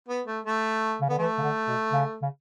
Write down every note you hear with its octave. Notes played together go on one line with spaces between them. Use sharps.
B3
A3
A3
C#3
D3 B3
E3 A3
C#3
D3
B2
C#3
C#3